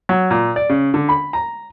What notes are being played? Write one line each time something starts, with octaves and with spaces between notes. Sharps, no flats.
F#3
A#2
D5
C#3
D3
B5
A#5